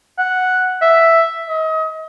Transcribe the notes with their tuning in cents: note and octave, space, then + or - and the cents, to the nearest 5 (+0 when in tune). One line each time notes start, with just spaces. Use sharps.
F#5 +0
E5 +5
D#5 +35